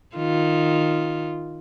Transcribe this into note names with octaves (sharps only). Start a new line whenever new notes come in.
D#3 F4